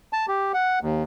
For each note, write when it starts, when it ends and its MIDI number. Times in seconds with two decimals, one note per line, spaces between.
0.13 0.26 81
0.28 0.52 67
0.54 0.79 78
0.81 1.03 39